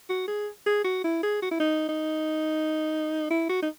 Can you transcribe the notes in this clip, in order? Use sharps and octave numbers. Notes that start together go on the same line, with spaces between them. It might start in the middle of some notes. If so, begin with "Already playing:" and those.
F#4
G#4
G#4
F#4
E4
G#4
F#4
E4
D#4
D#4
E4
F#4
D#4